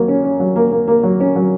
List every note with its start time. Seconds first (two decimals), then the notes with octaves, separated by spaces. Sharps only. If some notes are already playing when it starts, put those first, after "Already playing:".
Already playing: F#3 A#3
0.08 C#4
0.24 C#4
0.40 F#3
0.56 A#3
0.71 A#3
0.88 A#3
1.03 F#3
1.20 C#4
1.36 F#3